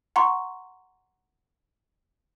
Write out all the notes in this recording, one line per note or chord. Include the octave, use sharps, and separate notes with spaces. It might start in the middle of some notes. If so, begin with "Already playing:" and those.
F#5 A#5 C6 C#6